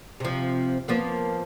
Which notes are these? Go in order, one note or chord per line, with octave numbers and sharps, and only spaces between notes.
C3 F3
F3 A#3 B3